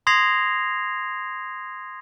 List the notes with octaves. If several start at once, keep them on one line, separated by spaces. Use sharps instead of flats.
C6 D#6 G#6 A#6 C7 F7